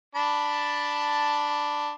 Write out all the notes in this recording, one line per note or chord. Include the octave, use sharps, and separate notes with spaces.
D4 A5 B5